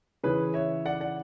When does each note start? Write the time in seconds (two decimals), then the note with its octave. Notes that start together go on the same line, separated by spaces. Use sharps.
0.24 C#3 E3 G#4 B4
0.54 C#5 E5
0.85 D5 F#5
1.00 D5 F#5